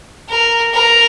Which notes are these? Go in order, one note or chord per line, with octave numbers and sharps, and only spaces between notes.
A#4
A#4